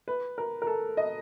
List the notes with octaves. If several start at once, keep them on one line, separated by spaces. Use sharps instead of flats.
B4
A#4
A#4
A4
D#5